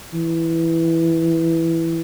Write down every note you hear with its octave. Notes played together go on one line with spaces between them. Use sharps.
E3